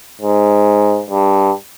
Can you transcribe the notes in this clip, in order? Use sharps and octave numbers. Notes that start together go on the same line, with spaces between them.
G#2
G2